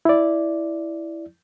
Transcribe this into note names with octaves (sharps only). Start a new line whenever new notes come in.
E4 D5